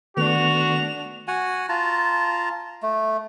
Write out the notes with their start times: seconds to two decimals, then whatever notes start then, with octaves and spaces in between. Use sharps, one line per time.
0.17 D#3 A3 B3 D4 F#4 F7
1.28 F#4 F#5 G#5
1.69 F4 A5 A#5
2.83 A3